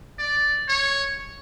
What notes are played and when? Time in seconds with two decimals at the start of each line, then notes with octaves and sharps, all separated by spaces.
0.18 D5
0.68 C#5